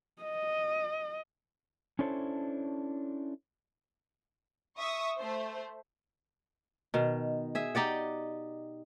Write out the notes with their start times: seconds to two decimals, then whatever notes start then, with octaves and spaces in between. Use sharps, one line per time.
0.22 D#5
1.99 C#4 D4 E4 A4 C5 C#5
4.78 E5 C#6 D#6
5.18 A3 C5
6.94 B2 D#3
7.55 G#4 E5
7.75 D#4 G4 D5 F#5